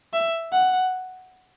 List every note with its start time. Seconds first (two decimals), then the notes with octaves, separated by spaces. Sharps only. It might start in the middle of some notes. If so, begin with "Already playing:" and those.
0.13 E5
0.53 F#5